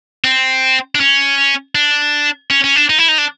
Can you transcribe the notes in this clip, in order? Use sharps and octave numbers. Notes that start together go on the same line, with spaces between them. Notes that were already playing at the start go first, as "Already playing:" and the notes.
C4
D4
C#4
D4
C#4
C#4
D4
D#4
E4
D#4
D4